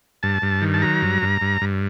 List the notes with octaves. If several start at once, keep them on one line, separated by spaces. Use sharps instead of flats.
G2 A5
G2
D#3
A5
F#3 A#5
G2
G2
G2
G2